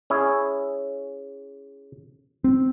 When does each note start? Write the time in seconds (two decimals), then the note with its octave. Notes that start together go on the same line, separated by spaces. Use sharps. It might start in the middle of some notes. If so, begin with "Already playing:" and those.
0.10 C#4 E4 G#4
2.44 C4